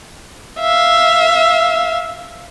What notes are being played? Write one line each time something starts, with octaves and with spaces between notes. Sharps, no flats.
E5 F5